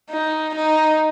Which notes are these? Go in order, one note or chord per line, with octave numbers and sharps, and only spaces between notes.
D#4
D#4